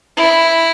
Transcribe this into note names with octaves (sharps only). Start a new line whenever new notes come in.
E4